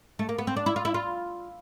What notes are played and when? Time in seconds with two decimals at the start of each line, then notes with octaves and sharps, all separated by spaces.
0.19 A3
0.29 A#3
0.38 B3
0.47 C4
0.56 D4
0.66 E4
0.76 F4
0.85 E4
0.94 F4